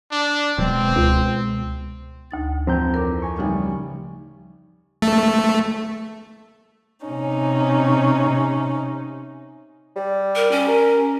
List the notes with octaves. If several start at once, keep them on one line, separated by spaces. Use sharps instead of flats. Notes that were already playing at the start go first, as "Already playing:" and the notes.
D4
D1 B2 G#3 B3 C4
C#2
D2 D#4 A6
F2 E3 C4 A#5 G6
A#4 C#5 D6
G#5 C#6
A1 C#3 F3 G3 D#4
A3
C3 C#4 D#4
G3
A#4
C#4
A#4